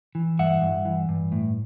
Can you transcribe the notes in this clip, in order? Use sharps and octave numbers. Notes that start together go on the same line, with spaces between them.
E3
G2 E5 F#5
G2
E3
G2
A2